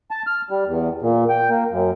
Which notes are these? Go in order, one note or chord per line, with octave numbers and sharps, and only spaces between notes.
A5
F6
G3
E2
A#2
G5
A#3
F#2